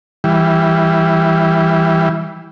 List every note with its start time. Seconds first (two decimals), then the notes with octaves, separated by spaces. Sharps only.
0.24 E3 G3